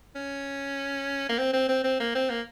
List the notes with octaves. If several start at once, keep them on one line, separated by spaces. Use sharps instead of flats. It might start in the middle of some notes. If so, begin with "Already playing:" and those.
C#4
A#3
C4
C4
C4
C4
A#3
C4
A#3